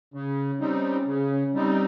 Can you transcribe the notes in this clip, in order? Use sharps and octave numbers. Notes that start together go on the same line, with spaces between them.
C#3 C#4
G3 C4 D#4
C#3
G3 C4 D#4